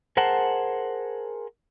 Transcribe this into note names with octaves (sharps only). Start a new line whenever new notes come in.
G#4 A#4 C5 F#5 A5